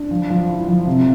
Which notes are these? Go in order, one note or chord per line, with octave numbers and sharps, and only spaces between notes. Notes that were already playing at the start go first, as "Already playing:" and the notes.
Already playing: D4
F3
F3
E4
F3
C3